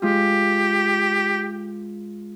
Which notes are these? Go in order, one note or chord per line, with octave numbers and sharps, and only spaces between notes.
G#3 F4 G4